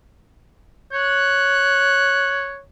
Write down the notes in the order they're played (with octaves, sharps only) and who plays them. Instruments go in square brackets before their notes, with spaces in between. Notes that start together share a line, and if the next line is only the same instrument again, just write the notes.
[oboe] C#5 [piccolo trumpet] F#6